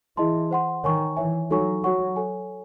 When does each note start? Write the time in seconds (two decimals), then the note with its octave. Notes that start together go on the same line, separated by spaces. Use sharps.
0.17 E3 E4 G#4 D#5 A5 C6
0.51 C5 F#5 C6
0.84 D#3 C#5 G#5 C#6
1.16 E3 C#5 E5 G#5
1.50 F#3 D#4 A4 C#5 G#5 C#6
1.83 F#3 F#4 C#5 F#5 C#6
2.16 A4 C#5 G#5